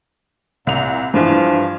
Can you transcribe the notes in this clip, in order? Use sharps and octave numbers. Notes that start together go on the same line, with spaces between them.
C2 A#2 F7
G2 E3 F3